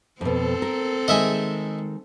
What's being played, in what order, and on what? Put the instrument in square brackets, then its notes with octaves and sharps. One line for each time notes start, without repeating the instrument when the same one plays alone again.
[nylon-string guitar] F2 B2 [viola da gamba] C4 A4
[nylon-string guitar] A#4
[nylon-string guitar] D#3 G#3 [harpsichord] D#5 E5 G#5